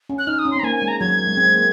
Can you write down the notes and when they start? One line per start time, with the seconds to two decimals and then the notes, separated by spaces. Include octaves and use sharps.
0.09 C#4
0.18 F#6
0.27 D#4 F6
0.39 D#6
0.45 C#4
0.51 C6
0.56 C4
0.59 A#5
0.63 A#3 G#5
0.76 G#5
0.82 G#3
0.88 A#5
1.01 F#3 G#6
1.19 F#3
1.27 G#3
1.37 C4
1.46 G#3
1.54 A#3